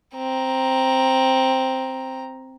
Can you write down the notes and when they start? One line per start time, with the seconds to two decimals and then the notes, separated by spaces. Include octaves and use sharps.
0.15 C4 A#5